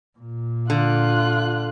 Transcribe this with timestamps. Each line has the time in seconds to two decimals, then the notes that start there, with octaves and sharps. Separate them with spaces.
0.18 A#2
0.70 D3 F4 F#6